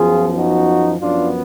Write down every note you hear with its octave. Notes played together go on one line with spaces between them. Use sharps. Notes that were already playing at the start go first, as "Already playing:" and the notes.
Already playing: F#2 F3 B3 F4 G#4
D#4 F#4
F#2 F3 B3 D4 F4